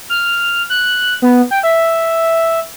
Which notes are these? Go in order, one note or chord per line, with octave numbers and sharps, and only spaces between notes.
F6
F#6
B3
G5
E5